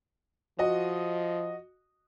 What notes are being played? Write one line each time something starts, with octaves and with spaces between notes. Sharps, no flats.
F3 F#4 D#5